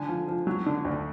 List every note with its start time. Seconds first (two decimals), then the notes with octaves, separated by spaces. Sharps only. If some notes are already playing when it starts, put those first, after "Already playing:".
Already playing: D3 G#5
0.09 F3
0.28 F3
0.47 F#3
0.66 D3
0.85 D2